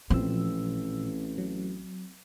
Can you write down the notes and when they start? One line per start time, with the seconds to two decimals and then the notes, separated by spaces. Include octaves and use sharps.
0.10 A1 A#2 F3 C4 E6
1.38 F#3